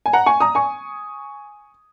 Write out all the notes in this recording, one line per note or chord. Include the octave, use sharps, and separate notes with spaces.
G#5
F#5 A#5
G#5 C#6
A#5 D#6
G#5 C#6